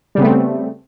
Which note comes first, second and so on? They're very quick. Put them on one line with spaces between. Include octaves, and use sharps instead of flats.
G3 C#3 B3 A3 C4